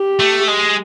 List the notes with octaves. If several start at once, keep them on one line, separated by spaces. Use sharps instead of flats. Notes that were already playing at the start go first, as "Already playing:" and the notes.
Already playing: G4
A3
G#3